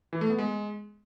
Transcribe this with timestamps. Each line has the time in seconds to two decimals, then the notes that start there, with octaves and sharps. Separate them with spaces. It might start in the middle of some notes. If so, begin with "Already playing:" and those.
0.13 E3
0.21 A3
0.30 B3
0.39 G#3